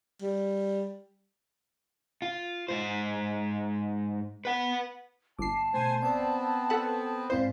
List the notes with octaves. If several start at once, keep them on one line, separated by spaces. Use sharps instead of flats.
G3
F4
G#2 C5
B4 F#5
G1 A5 D6 C7
B2 A3 C5 G#5
B3 C4 D5 G5
A4 B4 F#5
G#2 G3 C4 E4 C5 F5